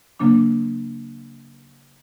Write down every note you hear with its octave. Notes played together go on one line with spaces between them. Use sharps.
C#3 F#3 A#3 D4 D6